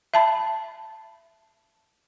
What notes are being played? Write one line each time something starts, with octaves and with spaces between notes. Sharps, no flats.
E5 A5 B5